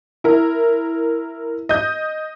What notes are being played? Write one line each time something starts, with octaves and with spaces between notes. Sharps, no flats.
E4 A#4
D#5 G6